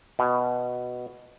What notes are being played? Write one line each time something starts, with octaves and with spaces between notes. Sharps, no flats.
B2